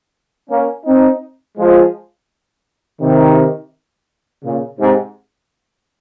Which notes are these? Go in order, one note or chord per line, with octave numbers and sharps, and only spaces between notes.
A#3 C#4
C4 D#4
F3 G#3
C3 D#3
A#2 C#3
G#2 C3